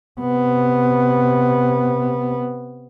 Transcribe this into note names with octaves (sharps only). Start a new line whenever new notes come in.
C3 B3